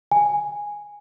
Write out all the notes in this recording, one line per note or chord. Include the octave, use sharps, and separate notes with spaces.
G#5